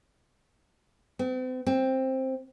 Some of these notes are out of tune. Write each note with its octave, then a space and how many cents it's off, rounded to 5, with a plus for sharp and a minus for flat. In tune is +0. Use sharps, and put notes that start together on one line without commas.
C4 -40
C4 +10